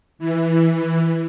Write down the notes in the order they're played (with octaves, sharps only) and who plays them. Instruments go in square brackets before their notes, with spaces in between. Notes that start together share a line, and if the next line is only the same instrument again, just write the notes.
[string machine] E3